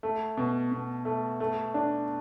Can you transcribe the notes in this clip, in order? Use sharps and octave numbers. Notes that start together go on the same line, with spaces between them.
A3
B2
B2
A3
A3
D4